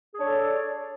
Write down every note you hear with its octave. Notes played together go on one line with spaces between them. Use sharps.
D4 G#4 A4 C#5 D5